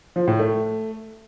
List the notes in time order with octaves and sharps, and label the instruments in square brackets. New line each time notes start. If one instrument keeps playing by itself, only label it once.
[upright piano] F3
A2
A3